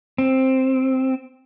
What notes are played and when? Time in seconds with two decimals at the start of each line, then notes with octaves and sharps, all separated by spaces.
0.18 C4